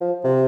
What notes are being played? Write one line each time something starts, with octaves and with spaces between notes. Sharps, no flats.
F3
C3